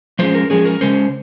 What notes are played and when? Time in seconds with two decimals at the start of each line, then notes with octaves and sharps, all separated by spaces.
0.19 F3 G#3 C#4 C5
0.35 A#4
0.50 F3 G#3 C#4 G#4
0.65 A#4
0.81 C#3 G#3 C#4 C5